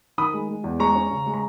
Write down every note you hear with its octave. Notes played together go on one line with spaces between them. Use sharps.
D#3 B5 D#6
G#3
G#3
E2
G#3 A#5 C#6
C#4
C#3
G#3
A#5